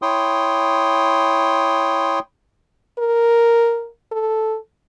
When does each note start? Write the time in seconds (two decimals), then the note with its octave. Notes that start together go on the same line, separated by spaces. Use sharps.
0.02 E4 C#5 G5 C6 D#6
2.99 A#4
4.12 A4